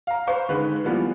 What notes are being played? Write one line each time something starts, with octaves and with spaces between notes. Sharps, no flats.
F5 A#5
B4 C5 F5 C6 C#6
D3 D#3 G#3 B4
E3 F3 G3 A#3 B3